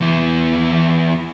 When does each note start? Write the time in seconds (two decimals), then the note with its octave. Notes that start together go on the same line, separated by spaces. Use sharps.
0.01 E2 E3